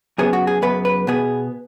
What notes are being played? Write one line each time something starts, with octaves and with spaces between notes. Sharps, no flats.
F#2 C#3 B3 G#4
F#4
G#4
F#2 C#3 B3 B4
B4
B2 B3 G#4